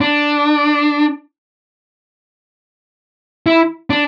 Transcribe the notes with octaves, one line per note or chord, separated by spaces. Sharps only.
D4
E4
D4